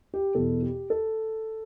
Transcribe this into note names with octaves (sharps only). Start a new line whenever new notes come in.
G4
E2 B2 A4
G4
A4